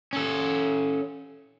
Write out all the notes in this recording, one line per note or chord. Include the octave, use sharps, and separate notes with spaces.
C#4 A4